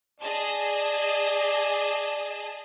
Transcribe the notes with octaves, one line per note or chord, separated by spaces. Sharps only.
G#4 D5 D#5 A5